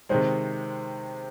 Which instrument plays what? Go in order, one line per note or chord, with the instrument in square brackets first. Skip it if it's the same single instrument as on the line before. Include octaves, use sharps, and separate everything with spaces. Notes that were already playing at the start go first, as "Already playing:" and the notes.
[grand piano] C3 D#3 G#3 [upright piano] C5